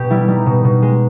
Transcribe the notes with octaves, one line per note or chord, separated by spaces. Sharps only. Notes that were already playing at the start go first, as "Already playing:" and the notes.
Already playing: B2 G4
G3 E4
G3 D#4
B2
B2
G#3